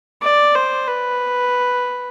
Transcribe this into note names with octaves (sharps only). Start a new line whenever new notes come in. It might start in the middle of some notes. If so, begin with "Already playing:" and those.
D5
C5
B4